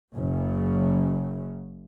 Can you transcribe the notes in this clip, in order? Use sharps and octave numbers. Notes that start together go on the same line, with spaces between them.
F#1 F#2 C#3